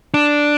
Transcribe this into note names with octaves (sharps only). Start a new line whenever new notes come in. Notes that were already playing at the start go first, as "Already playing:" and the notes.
D4